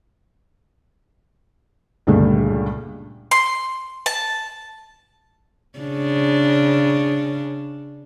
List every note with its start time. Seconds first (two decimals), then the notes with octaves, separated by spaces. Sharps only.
2.07 C#2 G2 A#2 D3 A3
3.31 C6
4.06 A5
5.79 C#3 D4